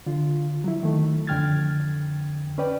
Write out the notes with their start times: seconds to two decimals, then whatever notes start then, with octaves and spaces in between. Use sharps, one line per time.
0.06 D3 F4
0.64 F#3 E4
0.83 D#3 A3
1.27 F2 D3 G5 F6 G#6 A6
2.58 C#4 B4 D5 G5